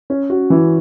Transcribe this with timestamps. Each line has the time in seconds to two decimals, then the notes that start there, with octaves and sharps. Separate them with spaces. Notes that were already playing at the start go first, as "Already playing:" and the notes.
0.10 C#4
0.30 F#4
0.50 E3